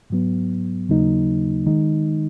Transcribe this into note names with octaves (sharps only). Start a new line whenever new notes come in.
G#2 F#3 B3
D#2 C#3 F#3 A#3 D#4
D#3 G#3 D#4